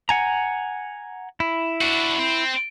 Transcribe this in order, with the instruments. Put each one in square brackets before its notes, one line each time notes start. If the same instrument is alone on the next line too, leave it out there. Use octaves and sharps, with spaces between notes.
[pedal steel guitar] F#5 G#5 A#5
E4
[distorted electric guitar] D4 F#4
C4